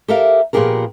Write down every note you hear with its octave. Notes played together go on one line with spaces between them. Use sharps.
G4 A4 A#4 E5 F5
A#2 F3 B3 G4 G#4 A#4